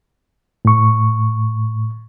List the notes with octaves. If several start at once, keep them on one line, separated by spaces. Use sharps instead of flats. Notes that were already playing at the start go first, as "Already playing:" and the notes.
A2 C#6